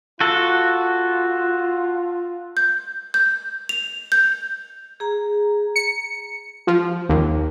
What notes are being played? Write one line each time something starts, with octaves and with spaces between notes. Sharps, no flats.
F4 F#4 A4
G6
G6
F7
G6
G#4 A#5
C#7
F3
D#2